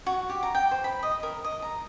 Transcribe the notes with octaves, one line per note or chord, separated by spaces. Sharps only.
F#4
G4
A#5
G5
C5
B5
D#5
A#4
D#5
A#5